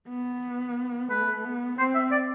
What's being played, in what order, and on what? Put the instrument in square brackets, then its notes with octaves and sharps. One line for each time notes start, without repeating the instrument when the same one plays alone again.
[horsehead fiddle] B3
[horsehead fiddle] A3 [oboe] B4
[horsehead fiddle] B3
[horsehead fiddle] C4 [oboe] C5
[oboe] E5
D5